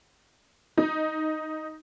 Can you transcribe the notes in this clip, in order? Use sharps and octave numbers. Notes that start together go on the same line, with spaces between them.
D#4